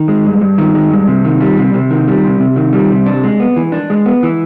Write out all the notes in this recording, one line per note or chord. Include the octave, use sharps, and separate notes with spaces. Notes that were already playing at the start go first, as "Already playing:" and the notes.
Already playing: D#3
G#3
G2
G2
D#3
G#3
G2
C3
D#3
G3
C3
C3
D#3
G3
C3
C3
D#3
G3
C3
D4
G#3
B3
E3
D4
G#3
B3
E3